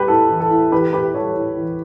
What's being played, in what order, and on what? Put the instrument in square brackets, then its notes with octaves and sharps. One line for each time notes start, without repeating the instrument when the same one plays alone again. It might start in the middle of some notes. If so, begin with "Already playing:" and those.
Already playing: [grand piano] G3 G4 B4
A2 A4
E3
A4
A2
E3 G4 B4
A2 G4 B4
G3 A4 C#5
A2
E3